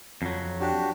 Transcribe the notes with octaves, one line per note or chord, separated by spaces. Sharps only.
F2 F#3
D4 F#4 G4